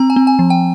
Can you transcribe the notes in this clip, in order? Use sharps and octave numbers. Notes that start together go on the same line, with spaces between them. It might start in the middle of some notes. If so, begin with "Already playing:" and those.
Already playing: C4 A#5
G#5
C4
G#5
F3
G5